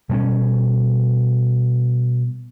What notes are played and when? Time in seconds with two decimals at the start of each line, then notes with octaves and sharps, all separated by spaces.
0.09 B2 G3 A#3 C#4